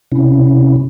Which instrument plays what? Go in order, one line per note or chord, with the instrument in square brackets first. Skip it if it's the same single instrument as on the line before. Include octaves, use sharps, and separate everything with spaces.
[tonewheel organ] C3 C#4 E4